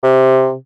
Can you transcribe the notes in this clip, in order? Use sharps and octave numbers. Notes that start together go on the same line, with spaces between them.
C3